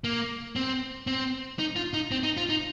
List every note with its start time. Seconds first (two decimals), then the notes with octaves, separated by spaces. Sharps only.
0.04 A#3
0.56 C4
1.07 C4
1.59 D#4
1.76 F4
1.93 D#4
2.11 C4
2.23 D#4
2.37 F4
2.49 D#4